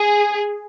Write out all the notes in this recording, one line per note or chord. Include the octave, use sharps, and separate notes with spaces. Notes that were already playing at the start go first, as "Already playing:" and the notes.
Already playing: G#4